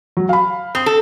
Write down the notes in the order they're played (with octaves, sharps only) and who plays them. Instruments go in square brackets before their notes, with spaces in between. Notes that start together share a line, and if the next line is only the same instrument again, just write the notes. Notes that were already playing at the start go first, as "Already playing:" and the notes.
[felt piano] F#3
F5 B5
[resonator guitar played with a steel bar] C4 [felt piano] D#6
[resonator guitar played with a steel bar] A4